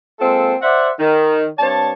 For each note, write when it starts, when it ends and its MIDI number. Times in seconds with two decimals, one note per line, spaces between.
0.20 0.54 56
0.20 0.54 58
0.20 0.54 60
0.20 0.54 65
0.20 0.54 69
0.61 0.90 72
0.61 0.90 74
0.61 0.90 76
0.61 0.90 78
1.00 1.47 51
1.59 1.92 43
1.59 1.92 60
1.59 1.92 73
1.59 1.92 74
1.59 1.92 81